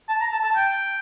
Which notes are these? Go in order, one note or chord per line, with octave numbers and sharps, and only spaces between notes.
A5
A#5
A5
A5
G5